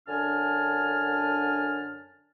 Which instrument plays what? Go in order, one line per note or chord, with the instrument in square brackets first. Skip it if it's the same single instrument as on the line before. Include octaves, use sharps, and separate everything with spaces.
[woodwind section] F#2 D3 D4 G#5 A5 F6